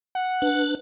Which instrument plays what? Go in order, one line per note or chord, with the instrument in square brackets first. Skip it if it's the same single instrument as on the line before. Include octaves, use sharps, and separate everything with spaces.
[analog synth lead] F#5
[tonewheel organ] D4 B4